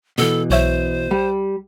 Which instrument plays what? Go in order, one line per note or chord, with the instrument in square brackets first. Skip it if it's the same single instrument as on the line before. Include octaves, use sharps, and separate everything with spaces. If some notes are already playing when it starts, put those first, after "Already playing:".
[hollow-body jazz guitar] B2 E3 [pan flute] A4
[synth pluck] B1 C#5 E5 [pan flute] C5
[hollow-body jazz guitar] G3